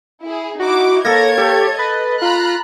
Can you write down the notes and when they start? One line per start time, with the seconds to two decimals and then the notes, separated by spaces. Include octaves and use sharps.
0.23 E4 G#4
0.59 D#4 E4 F#4 D6
1.05 A#3 A4 C#5 G#6 A#6
1.38 G4 A4
1.79 B4 D#5
2.22 F4 A#5 B5 F#6